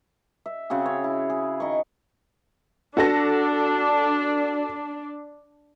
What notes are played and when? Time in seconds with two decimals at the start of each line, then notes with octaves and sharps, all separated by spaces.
0.46 E5
0.70 C#3 C4 F#4 G#4
0.86 C#5
1.04 E4
1.30 G#4
1.60 D#3 D#5 C#6
2.97 D4 F#4 A4 A#6